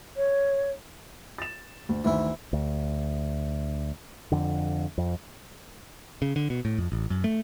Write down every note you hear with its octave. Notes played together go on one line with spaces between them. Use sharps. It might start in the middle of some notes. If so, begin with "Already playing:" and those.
C#5
A6 E7
D2
D2 D#3 E3 E4
D2
F2 D3
F2
C#3
D3
B2
A2
F2
A1
F#2
A3